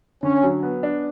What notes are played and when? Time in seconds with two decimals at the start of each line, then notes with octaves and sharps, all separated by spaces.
0.23 D3 C#4
0.43 F#3
0.63 B3
0.83 D4